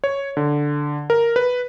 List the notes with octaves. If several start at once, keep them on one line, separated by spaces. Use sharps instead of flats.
C#5
D3
A#4
B4